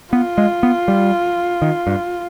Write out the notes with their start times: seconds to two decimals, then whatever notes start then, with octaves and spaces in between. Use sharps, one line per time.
0.13 B3 F4
0.38 G#3
0.63 B3
0.88 G3
1.62 D#3
1.87 G2